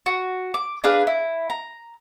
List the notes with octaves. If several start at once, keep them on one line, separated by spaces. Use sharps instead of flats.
F#4
D6
D4 G#4 B4 F5
E4
A#5